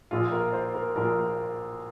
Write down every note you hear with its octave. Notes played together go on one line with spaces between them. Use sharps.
A#1 A#2 F3 F4
A#4
C5
A#4
A#1 A#2 F3 A#4